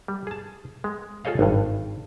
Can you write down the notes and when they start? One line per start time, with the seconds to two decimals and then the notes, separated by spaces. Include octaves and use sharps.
0.08 G3
0.27 G#4 A5
0.84 G#3
1.25 F4 G#4 A4 C#5 D#5 F5
1.39 G#1 G2